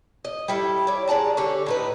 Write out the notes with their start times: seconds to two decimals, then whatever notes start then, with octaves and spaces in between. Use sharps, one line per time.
0.25 D#5
0.48 G3 E4 A4
0.87 C#5 D5
1.08 G#3 D5 A5 A#5
1.37 D3 G4 A4 C#5
1.66 A2 D#4 B4